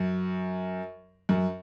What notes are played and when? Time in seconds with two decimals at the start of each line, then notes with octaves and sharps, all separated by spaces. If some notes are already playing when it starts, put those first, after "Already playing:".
Already playing: F#2
1.29 F#2